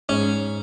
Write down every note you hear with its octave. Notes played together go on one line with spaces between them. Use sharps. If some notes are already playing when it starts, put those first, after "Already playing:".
G#2 C#4